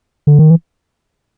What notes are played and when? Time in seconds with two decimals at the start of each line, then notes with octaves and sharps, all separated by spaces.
0.27 D3
0.39 D#3
0.50 E3